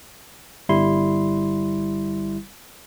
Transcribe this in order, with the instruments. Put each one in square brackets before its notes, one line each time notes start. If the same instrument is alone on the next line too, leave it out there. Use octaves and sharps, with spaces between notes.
[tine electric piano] G1 G3 E4 C6